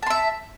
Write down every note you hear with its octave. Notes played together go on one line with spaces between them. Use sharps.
E5 A5 C6